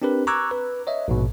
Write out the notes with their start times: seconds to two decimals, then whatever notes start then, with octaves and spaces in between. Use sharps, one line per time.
0.02 C4 D4 G4 A#4 B4
0.27 A#5 C#6 D6 E6 F#6 G#6
0.51 B4
0.87 C#5 D#5 E5
1.08 A#1 G#2 B2